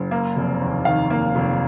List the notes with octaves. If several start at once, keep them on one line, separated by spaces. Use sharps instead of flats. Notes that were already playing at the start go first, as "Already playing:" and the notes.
Already playing: F#1
A#3
F1
D#2
D#3 F5
A#3
F1